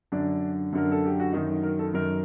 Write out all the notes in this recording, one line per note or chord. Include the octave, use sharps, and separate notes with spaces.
F#2 D3 D4
F#2 D3 A#4
A4
G4
F#4
F#2 D#3 D#4
A#4
A4
F#2 D#3 A#4